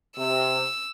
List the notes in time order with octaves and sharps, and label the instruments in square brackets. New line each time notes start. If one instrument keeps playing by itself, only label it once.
[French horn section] C3 [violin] E6